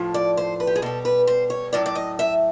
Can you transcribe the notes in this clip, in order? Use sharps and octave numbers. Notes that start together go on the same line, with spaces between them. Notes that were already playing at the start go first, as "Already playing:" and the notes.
Already playing: A2 F3
D5
C5
B4
G4
G#4
B2 G3 A4
B4
C5
C#5
A2 F#3 D5
D5
D#5
E5